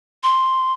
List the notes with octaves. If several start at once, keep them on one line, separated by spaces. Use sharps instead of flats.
C6